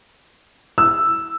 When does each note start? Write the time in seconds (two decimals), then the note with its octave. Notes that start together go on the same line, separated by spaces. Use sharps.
0.78 E6